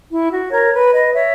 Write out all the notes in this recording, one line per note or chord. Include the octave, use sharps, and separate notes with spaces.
E4
F#4
A#4 C#5
B4
B4 D#5
C#5 E5